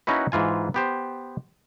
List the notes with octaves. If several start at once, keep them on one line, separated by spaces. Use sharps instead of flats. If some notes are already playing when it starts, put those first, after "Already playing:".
A#3 C#4 D#4 E4 F#4 B4
G#2 E3 F4 G#5
B3 G4 C5